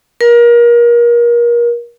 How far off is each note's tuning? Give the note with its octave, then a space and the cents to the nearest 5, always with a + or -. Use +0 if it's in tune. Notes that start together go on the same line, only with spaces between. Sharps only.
A#4 +30